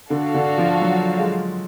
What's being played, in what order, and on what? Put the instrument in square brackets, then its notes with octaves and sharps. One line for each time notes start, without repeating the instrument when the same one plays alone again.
[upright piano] D3 [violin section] D4 F#4 A4 F5
[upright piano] D3
F3
F#3
G#3